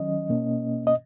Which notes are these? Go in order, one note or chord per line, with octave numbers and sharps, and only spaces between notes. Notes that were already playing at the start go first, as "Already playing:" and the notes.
Already playing: D#3 F#3 C#4 D#5
B2 A#3 C#4
D#5